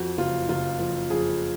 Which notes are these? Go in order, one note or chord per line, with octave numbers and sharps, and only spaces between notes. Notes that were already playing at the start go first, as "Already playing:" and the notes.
Already playing: F2 F#4
F#1 F4
F#1 F4
F3
F2 G#4